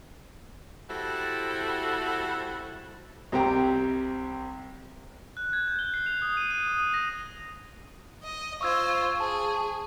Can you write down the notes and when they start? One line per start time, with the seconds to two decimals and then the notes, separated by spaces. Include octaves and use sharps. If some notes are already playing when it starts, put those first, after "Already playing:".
0.90 G3 C4 E4 F#4 A4
3.32 C2 G3 C4 G4 G5 A#5
5.37 F#6
5.53 G#6
5.68 G6
5.79 G7
5.94 C7
6.06 F7
6.22 D#6
6.37 D#7
6.50 D#7
6.68 D#6
6.80 D#6
6.94 A#6
8.24 D#5
8.61 F4 C5 C#6 E6 G#6
9.17 G#4 A5 C#6